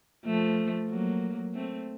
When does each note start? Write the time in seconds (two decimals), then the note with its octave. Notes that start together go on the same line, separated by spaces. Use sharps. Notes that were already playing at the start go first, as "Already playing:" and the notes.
0.25 F3 A3
0.89 F#3 A#3
1.54 A3 C4